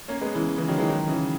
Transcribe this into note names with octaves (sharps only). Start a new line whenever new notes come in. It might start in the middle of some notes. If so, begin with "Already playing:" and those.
A#3 C#4
G#3 B3
C#3 E3
C#3 E3
D#3 F#3
E3 G#3
D#3 F#3
C#3 E3